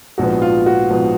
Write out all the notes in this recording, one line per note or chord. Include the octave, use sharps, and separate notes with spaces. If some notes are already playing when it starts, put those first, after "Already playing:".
A#1 G#2 F3 B3 F#4
F4
F#4
A#1 G#2 F3 B3